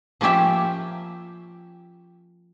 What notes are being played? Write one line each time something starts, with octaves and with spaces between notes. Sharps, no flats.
F3 A#3 C#4 G4 E5